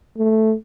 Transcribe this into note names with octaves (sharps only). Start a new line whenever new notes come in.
A3